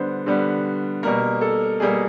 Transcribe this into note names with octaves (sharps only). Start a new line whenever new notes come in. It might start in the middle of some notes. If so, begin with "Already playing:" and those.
Already playing: D3 G3 B3 C5
D3 G3 B3
B2 G3 A#3 A#4
A4
B2 G3 A#3 G#4